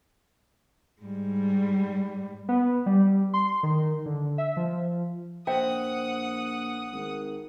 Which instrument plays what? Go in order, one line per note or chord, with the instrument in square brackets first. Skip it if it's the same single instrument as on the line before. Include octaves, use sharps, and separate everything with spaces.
[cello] G#2 G3
[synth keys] B3
G3
C6
D#3
D3
E5
F3
[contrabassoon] A#1 [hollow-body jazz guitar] C5 E5 [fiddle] F#5 D#6 [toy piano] G5
[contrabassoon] G#1